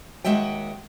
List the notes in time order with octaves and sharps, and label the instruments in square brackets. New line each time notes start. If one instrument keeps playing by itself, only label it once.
[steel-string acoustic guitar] D#2 G#3 F#4 D#5 E5 G5